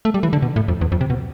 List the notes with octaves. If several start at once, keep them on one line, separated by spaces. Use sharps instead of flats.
A3
G3
E3
D3
B2
A2
F2
E2
F2
C3
B2